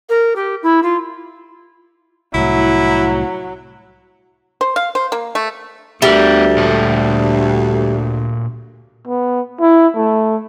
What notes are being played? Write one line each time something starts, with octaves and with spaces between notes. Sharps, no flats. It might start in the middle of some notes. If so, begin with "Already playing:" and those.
A#4
G4
E4
F4
C2 A2 F#3 E4
C5
F5
C5
A#3
A3
D2 G3 B3 A#4 E5
A#2 A4
B3
E4
A3